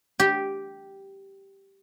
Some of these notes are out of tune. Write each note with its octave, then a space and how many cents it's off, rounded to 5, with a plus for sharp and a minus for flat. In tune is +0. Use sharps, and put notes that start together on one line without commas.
G4 -5